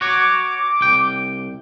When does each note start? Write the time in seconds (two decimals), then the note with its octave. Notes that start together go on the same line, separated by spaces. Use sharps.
0.01 F#4 C#5 D6
0.81 C2 G5